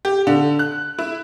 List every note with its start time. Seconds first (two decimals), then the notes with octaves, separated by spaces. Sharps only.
0.05 G4
0.27 D3
0.59 F#6
0.99 E4